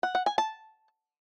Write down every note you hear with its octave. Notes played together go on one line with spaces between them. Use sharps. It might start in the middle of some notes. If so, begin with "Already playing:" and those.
F#5
F#5
G#5
A5